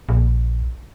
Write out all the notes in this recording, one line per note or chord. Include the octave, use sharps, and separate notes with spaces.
A#1